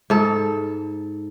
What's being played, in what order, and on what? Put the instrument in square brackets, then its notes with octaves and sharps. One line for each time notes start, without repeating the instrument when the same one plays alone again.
[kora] G#2 A4